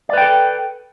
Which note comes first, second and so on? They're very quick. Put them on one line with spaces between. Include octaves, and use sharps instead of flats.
D5 B4 G5 A4